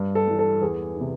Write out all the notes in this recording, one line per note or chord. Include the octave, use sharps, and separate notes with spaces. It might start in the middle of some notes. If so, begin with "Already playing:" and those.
Already playing: G2
A4
E3 G3
A4
E2 G#4
C3 E3